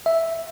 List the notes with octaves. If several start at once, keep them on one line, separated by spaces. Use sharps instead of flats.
E5